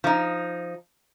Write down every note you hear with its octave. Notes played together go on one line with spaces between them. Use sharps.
F3 D#4